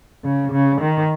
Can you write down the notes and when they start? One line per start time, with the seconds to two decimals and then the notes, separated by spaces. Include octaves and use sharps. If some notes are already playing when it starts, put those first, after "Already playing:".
0.24 C#3
0.52 C#3
0.81 D#3